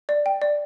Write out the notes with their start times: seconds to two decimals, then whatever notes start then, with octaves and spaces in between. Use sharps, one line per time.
0.09 D5
0.26 G5
0.42 D5